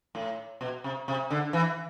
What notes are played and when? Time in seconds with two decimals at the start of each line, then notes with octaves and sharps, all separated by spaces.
0.15 A2
0.61 B2
0.84 C3
1.08 C3
1.30 D3
1.53 E3